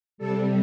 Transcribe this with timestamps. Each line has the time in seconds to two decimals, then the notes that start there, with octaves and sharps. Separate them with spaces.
0.18 C3 G3 A4